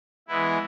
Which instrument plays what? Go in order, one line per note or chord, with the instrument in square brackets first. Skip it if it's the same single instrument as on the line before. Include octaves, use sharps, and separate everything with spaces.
[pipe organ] E3 G#3 B3 E4